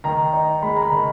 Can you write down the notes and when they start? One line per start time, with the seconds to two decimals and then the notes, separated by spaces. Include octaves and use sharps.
0.04 D#3 A#5
0.33 D#4
0.62 G#3 B5
0.76 A#5
0.82 B5
0.92 D#3